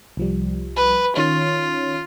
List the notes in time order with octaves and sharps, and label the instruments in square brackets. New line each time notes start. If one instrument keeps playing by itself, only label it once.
[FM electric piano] C2 F3 G3
[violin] B4
[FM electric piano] D#3 C#4 C#5 [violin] F4